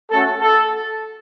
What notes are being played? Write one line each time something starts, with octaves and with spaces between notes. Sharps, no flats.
A3 C#4 F#4 A4
A4